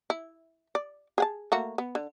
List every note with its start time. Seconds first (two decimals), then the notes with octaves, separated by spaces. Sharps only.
0.10 E4
0.75 D5
1.18 G#4 F#5 A5
1.52 A3 A#3 F#4
1.78 B3
1.95 D3